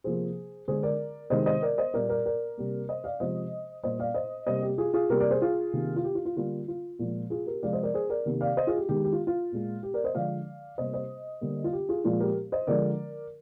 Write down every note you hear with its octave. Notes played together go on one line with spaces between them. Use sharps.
C3 F3 A#3 G#4 C5
D3 G#3 G#4 C5
A#4 D5
C3 D#3 G#3 C5 D#5
C5 D#5
A#4 D5
C5 D#5
A#2 G3 A#3 A#4 D5
A#4 D5
A#4 D5
C3 G3 A#3
C5 D#5
D5 F5
C3 F3 G#3 C5 D#5
A#2 G3 A#3 C5 D#5
D5 F5
C5 D#5
C3 G3 A#3 C5 D#5
G4
F4 G#4
F4 G#4
C3 G3 A#3 G4 A#4
A#4 D5
G#4 C5
F4 G#4
C3 D#3 A#3
F4
G4
F4
F4
D3 G3 A#3 F4
F4
A#2 F3 G#3
F4 G#4
G4 A#4
C3 F3 G#3 D5 F5
C5 D#5
A#4 D5
G#4 C5
A#4 D5
C3 D#3 A#3
D5 F5
C5 D#5
F4 G#4
G4
D#3 G#3 G4
G4
F4
F4
A#2 G#3
G4
A#4 D5
C5 D#5
D3 F3 G#3 D5 F5
C3 G3 A#3 C5 D#5
C5 D#5
D3 G3 A#3
F4
G4
F4 G#4
A#2 F3 G#3 F4
G4 A#4
C5 D#5
D3 F3 G#3 A#4 D5